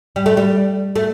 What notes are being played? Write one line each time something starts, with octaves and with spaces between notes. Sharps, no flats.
G3
A3
G3
A3